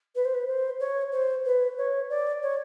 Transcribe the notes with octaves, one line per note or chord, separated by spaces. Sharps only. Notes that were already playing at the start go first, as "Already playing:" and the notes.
B4
C5
B4
C5
C#5
C5
B4
C#5
D5
C#5